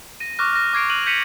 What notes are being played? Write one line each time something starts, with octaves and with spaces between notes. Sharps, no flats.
A#6 D#7
C#6 D6 F6 F#6 A#6
F6 A#6
D6 G#6 C7 D7
F6 F#6 D#7 F7 F#7
G6 B6 C#7 D#7 F7 F#7